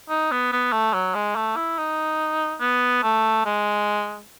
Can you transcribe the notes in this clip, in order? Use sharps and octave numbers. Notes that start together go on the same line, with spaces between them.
D#4
B3
B3
A3
F#3
G#3
A3
E4
D#4
B3
A3
G#3